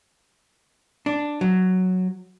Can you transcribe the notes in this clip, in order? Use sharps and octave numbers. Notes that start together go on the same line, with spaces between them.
D4
F#3